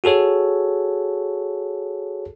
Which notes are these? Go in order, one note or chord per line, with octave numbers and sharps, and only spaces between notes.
F#4 G#4 A4 C#5